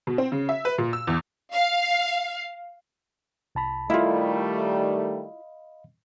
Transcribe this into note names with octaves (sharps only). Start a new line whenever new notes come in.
B2
C4
C#3
E5
B4
A#2
E6
E2
F5
C2 A5 B5
D#3 G3 A3 E4 F4 D#5 F5 B5